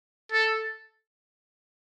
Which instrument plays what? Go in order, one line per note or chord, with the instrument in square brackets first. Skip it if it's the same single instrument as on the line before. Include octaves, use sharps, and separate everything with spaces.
[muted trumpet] A4